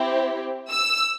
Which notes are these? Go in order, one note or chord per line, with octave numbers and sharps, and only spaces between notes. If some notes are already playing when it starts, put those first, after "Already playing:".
Already playing: C4 E4 G4
E6